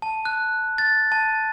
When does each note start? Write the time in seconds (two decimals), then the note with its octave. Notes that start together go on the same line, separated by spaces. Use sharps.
0.02 A5
0.25 F#6
0.78 A6
1.12 A5